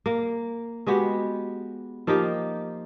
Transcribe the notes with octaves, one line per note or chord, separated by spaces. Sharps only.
A#3
G#3 B3 F#4 G4
F3 A#3 D#4 G4